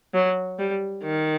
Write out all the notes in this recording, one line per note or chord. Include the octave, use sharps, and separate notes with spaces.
F#3
G3
D#3